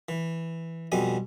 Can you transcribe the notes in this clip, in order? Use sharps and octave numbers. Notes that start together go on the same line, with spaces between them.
E3
F2 B2 G3 G#5